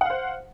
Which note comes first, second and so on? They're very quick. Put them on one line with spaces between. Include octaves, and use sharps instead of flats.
F#5 F5 C5